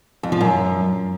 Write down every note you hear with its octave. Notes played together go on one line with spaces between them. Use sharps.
F2
F3
F#2